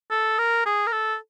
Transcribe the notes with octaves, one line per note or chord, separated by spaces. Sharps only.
A4
A#4
G#4
A#4
A4